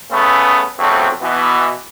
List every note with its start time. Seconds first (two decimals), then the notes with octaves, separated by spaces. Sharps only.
0.11 C#3 A3 B3 C#4
0.78 B1 F2 C#3 A3 C4 F#4
1.21 B2 E3 B3